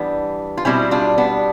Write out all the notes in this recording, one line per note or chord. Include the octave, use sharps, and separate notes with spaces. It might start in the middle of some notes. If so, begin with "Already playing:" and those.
Already playing: E3 G3 B3 D4
F4
B2 G3 C4 E4
D4 F4
B3 D4